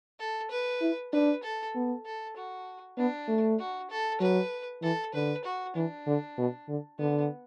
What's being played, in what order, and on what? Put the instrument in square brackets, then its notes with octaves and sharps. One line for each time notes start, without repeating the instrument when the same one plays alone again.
[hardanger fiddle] A4
B4
[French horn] E4
[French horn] D4 [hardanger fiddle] B4
[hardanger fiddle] A4
[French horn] B3
[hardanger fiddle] A4
F#4
[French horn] B3 [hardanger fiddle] D4
[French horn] A3
[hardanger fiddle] F#4
A4
[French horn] F#3 [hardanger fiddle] B4
[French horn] E3 [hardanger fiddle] A4
[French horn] D3 [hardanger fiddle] B4
[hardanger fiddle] F#4
[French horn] E3 [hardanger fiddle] D4
[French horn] D3
B2
D3
[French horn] D3 [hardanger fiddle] B3